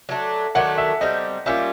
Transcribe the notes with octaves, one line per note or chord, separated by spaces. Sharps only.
F#3 A3 D4
D#3 F#3 A3 D4 F#5
E5
G3 C4 D#4 D#5
G3 A#3 C#4 F4 E5